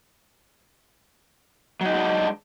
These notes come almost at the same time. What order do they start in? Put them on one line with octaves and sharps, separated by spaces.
F#3 D#4 G#3 F#4 D4